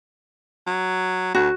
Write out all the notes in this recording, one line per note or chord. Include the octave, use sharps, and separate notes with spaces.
F#3
D2 F#4